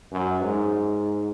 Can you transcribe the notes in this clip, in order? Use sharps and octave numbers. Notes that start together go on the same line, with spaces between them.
F#2
G#2